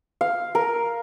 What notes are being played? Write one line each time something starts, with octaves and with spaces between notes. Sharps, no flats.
F5
A#4